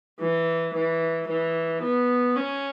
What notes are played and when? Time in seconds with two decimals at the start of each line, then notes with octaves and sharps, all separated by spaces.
0.20 E3
0.74 E3
1.28 E3
1.82 B3
2.36 C#4